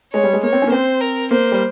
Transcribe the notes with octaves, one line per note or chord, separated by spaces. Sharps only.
G#3 C#5
G3
G#3
A#3 C#5
C4
C#4
A#3
C4 C5
A#4
A#3 C5
G3